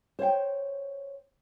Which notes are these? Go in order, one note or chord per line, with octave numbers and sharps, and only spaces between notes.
C5 C#5 F5 G5